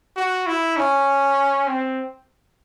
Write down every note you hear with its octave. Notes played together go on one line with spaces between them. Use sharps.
F#4
E4
C#4
C4